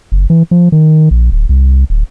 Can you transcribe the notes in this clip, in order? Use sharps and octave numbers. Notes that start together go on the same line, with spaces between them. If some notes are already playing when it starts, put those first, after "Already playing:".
F#1
E3
F3
D#3
A#1
D1
C2
D1